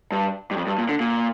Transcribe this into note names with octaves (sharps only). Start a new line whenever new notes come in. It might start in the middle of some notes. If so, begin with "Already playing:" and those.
G2
G2
F2
G2
A#2
D3
A#2